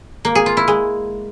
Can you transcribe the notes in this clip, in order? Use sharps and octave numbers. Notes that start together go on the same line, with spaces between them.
A#3
G#4
F4
E4
G#3